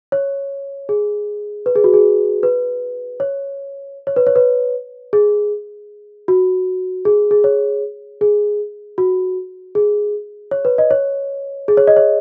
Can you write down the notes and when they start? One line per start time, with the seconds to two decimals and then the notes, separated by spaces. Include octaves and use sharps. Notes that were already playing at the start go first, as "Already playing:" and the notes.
0.12 C#5
0.89 G#4
1.66 B4
1.76 G#4
1.84 F#4
1.93 G#4
2.43 B4
3.20 C#5
4.07 C#5
4.16 B4
4.27 C#5
4.36 B4
5.13 G#4
6.28 F#4
7.05 G#4
7.31 G#4
7.44 C#5
8.21 G#4
8.98 F#4
9.75 G#4
10.51 C#5
10.65 B4
10.78 D#5
10.91 C#5
11.68 G#4
11.77 C#5
11.87 D#5
11.97 C#5